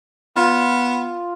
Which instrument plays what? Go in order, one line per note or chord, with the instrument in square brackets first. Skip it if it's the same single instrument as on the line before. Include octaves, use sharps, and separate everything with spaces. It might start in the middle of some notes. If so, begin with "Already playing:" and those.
[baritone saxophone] B3 [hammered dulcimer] F4